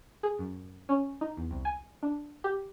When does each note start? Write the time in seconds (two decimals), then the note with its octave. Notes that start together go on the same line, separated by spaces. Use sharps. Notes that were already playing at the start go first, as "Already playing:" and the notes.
0.23 G#4
0.39 F#2
0.89 C#4
1.21 D#4
1.37 E2
1.51 C2
1.65 G#5
2.03 D4
2.44 G4